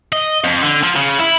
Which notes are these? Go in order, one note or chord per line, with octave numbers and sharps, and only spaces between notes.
D#5
F2
D3
F3
C#3
E4